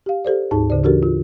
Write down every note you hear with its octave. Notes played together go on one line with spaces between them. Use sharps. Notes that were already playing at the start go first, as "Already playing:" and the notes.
G4 F5
G4 A4 C5 D5
D2 G#2 D#4 G#4 A5
D2 C#3 C5 D5
E3 D4 F#4 G4 A4 A#4
F4